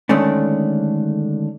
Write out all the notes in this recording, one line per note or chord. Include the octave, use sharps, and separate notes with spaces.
D3 D#3 G#3 A3 C#4 D4